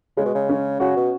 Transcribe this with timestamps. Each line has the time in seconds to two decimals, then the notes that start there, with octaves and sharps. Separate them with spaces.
0.17 C#3 G#3
0.26 B2
0.35 C#3
0.49 C#4
0.80 C#3 F#4
0.96 B2